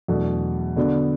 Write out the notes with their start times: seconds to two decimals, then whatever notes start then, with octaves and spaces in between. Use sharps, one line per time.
0.08 E2 B2 F#3 A3 D4
0.76 D3 B3 D4 F#4